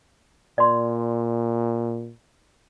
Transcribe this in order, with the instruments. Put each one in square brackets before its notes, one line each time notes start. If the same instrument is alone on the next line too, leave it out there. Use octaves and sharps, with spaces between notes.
[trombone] A#2 [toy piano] D5 C6